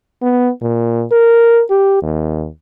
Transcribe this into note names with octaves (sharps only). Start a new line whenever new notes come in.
B3
A#2
A#4
G4
D#2